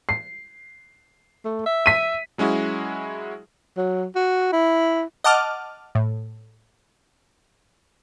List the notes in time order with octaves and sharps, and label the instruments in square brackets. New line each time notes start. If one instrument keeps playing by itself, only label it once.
[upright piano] C7
[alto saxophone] A3
E5
[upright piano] B6 D#7
[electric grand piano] F#3 G#3 C#4 E4 F#4 G#4
[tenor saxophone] F#3
F#4
E4
[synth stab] D#5 F#5 A5 D6 F6
A2